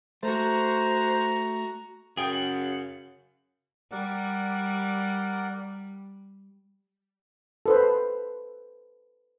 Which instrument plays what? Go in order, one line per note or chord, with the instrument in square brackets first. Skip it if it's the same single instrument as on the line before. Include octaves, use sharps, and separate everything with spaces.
[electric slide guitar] A3 [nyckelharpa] F#4 A#5 [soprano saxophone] C5
[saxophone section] F#2 C#3 [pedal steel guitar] G#4 G5
[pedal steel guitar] F#5
[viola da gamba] G3 [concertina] A#4 D5 F#5
[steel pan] A4 B4 C5